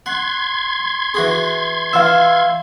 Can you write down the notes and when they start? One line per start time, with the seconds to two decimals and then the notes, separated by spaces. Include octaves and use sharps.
0.06 F#5 C6 G#6
1.14 E3 F#4 G#4
1.93 E3 F4 F5 E6